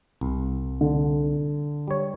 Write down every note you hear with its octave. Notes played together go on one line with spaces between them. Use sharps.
C2
D3
G3 C#5